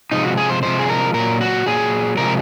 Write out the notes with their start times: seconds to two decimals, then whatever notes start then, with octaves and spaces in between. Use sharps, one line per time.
0.12 C3 F3 G#3 D#4
0.24 F#4
0.37 G#4
0.50 C5
0.63 C3 F3 G#3 C5
0.79 G#4
0.89 A#4
1.14 A#2 F#3 A#4
1.41 F#4
1.66 A#2 F#3 G#4
2.17 C3 F3 G#3 A#4